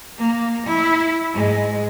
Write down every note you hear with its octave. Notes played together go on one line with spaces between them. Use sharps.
A#3
E4
G#2 G#3